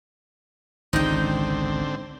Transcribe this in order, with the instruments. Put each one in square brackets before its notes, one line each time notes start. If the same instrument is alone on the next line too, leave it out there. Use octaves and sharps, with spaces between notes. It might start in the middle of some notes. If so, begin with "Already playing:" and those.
[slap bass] G#1 C#2 G#3 [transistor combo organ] D3 C4 [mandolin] D#4 G5